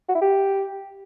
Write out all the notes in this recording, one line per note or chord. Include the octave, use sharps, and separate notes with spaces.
F#4
E4
G4